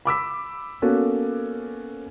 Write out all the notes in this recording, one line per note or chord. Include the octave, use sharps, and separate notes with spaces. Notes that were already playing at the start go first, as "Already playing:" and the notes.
B5 D6 E6 B6
A#3 B3 C#4 F#4 A4